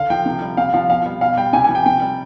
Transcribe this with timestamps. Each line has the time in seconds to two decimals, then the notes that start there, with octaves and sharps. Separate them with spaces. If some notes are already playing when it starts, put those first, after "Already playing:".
Already playing: D3 F5
0.10 F3 G5
0.26 C3
0.42 G3
0.57 C3 F5
0.74 F3 F5
0.89 B2 F5
1.06 G3
1.21 B2 F5
1.37 G3 G5
1.53 C3 G#5
1.64 G#5
1.69 F3
1.75 G5
1.86 C3 G5
2.01 G3